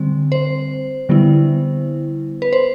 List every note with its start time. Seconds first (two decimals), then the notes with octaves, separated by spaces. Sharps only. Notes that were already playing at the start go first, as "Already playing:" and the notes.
Already playing: D3 G3 C4
0.32 C5
1.09 D3 G3 B3 E4
2.42 B4
2.53 C5